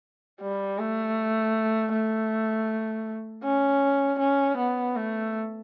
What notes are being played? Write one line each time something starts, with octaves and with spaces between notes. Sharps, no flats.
G3
A3
A3
C#4
C#4
B3
A3